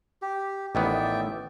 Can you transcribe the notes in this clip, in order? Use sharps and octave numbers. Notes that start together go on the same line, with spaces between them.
G4
A1 D#3 B3 D5 E5 G5